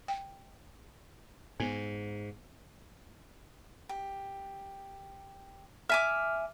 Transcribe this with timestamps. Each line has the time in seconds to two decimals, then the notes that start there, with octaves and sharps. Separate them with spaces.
0.08 G5
1.60 G#2 B3
3.89 G4
5.90 E5 G#5 D6 F6